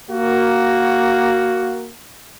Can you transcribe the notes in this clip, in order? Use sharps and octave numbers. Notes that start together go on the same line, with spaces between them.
A#3 F#4